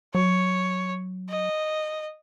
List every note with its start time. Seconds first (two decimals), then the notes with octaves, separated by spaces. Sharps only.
0.15 F#3 C#5
1.29 D#5